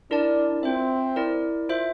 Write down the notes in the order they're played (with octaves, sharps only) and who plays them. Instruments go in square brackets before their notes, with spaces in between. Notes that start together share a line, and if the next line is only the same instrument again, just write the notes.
[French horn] D4 [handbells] E4 A#4 D5 A5
[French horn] C4 [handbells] F4 C5 E5
[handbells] E4 A#4 D5
F4 C5 E5